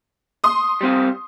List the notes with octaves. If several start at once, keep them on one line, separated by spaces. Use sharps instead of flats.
C6 D#6
G3 C4 F5